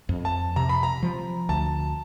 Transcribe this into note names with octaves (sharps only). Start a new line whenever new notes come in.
F2
A5
C3 A#5
B5
A#5
F3
D2 A5